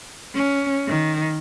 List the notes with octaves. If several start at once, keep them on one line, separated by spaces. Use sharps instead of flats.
C#4
D#3